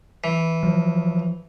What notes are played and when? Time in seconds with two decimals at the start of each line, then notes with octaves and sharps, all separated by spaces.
0.24 E3
0.63 F3 F#3